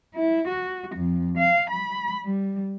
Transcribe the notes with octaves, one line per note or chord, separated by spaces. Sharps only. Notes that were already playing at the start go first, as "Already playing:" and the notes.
E4
F#4
F2
F5
B5
G3